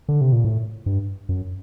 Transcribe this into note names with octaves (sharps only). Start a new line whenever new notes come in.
D3
C3
A#2
A2
G2
F#2